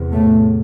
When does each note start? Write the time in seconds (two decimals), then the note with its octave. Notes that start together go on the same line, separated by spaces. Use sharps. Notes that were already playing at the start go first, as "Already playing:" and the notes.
Already playing: E2 C3
0.13 A2 A3